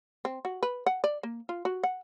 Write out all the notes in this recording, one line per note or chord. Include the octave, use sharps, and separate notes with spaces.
C4
F#4
B4
F#5
D5
A#3
F4
F#4
F#5